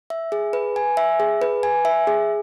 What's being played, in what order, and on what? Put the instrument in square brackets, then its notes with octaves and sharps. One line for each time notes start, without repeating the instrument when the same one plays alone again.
[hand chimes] E5
G#4
B4
G#5
E5
G#4
B4
G#5
E5
G#4